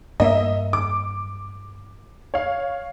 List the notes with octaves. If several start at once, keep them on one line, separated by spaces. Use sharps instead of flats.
G2 A#3 D#5 E5
D6
C#5 F5